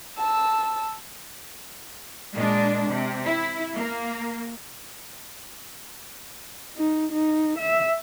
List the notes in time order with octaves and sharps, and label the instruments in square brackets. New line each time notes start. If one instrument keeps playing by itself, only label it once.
[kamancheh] A5 E6
[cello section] A#2 G#3 D4
C3
E4
A#3
[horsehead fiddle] D#4
D#4
E5